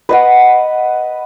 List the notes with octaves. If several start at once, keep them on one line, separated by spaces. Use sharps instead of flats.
B4 D#5 F#5